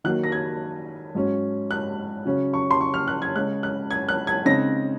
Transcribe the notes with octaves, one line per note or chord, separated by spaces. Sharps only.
D#3 F#3 A#3 F#6
A#6
G#6
G#2 F#3 C#4
F#6
C#3 F#3 C#4
C#6
C6
C#6
F6
F#6
G#6
C#3 G#3 C#4 F#6
F#6
G#6
F#6
G#6
C#3 G#3 C4 D#4 A#6